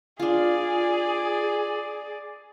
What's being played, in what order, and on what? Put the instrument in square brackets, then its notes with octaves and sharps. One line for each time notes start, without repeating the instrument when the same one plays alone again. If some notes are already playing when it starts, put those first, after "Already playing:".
[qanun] D4 F4 [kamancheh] G#4 D5